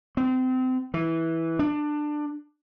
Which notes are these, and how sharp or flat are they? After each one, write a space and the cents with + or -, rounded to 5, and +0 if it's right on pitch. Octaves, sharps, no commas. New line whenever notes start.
C4 -30
E3 -10
D4 +20